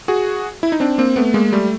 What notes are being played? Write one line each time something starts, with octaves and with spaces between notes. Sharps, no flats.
F#4 G#4
E4
D#4
C4 D4
A#3 C4
A3 B3
G#3 A#3
G3 A3